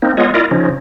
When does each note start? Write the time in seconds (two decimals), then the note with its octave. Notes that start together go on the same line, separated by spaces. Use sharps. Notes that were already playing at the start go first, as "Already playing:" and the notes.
0.02 A#3 C4 D#4
0.17 G#3 B3 F4 C#5 D#5
0.34 E4 F4 A#4 D5 D#5
0.51 C#3 F3 C#4 D#4